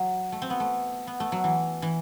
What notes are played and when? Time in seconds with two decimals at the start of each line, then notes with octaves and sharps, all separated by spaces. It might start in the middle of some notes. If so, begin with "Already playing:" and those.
Already playing: F#3
0.32 A3
0.42 C4
0.50 B3
0.60 A3
1.07 B3
1.20 A3
1.32 F#3
1.44 E3
1.82 E3